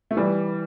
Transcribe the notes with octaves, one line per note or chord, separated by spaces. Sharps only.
A3
E3 G3